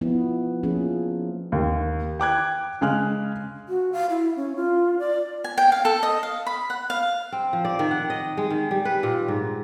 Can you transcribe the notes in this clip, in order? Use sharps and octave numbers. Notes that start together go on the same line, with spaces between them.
F3 B3 E4
F3 A#3 C#4 G#4
D#2
G5 D6 F#6 G#6
C#3 G#3 G#5 F6 F#6
F#4
F5
E4
C#4
F4
D5
G#5
G5
F5
A4
D#5
F5
B5
F#5
F5
C4
F3
D5
D#3
F#5
D#5
G#3
D#3
G3
B4
A#2
G#2